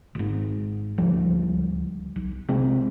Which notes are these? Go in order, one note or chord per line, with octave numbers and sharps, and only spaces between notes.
G#1 G#2
D1 C#2 F3 G3
B1
C3 G#3 C4